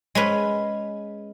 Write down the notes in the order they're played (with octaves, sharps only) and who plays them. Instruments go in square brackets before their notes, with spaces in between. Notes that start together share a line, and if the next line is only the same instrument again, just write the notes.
[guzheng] G#3 C#4 B4